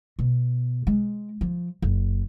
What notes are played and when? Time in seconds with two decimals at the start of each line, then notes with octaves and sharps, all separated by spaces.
0.19 B2
0.87 G#3
1.41 F3
1.82 F#1